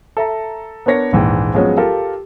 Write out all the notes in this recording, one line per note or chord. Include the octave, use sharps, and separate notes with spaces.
A4 E5 A#5
B3 D4 A#4 C#5 A#6
A#1 D#2 G#2 E3 G5
F3 F#3 G#3 B3 C#4 G#4
F4 G4 A4 A#4